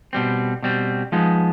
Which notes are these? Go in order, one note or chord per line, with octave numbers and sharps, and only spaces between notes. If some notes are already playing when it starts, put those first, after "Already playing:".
B2 G3 C4
B2 G3 C4
F3 G#3 B3 D#4